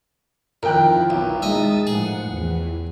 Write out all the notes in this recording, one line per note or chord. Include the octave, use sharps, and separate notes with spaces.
F2 D#3 E4 F4 A#4 G5 F#6
B1
G#3 D#4 D#5 E5 A5 D#6 A6
A2 F3 G#4 F#5
E2 E3